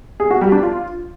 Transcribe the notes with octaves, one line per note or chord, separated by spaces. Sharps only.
G#4
F#4
G3
D4
F4